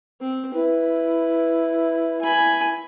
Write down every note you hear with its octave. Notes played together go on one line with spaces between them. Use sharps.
C4
E4 B4
G#5 B5